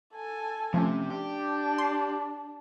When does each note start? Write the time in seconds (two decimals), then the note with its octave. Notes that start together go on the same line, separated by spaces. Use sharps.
0.14 A4 G#5
0.74 C3 F3 A3 C#4
1.10 D4 G4
1.78 C6